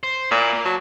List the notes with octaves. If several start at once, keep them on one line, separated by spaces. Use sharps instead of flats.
C5
A#2 E4
A#3
F#3 A5